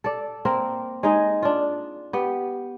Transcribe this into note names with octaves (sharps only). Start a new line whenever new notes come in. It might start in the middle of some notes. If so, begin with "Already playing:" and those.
A4 D5
A#3 C4 A#4
G#3 D#4 G#4
D4 F4
B3 G4